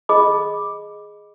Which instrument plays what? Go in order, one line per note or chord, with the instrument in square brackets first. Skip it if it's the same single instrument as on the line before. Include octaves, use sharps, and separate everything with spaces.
[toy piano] G#4 D#5 B5 D6